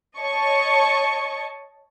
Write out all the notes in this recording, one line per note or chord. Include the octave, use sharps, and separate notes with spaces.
C#5 D#5 A5 C#6